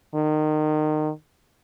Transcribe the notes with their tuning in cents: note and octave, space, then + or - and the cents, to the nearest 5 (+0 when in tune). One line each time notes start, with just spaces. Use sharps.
D#3 -25